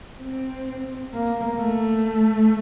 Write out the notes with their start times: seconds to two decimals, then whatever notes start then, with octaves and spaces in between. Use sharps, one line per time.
0.21 C4
1.13 A#3
1.58 A3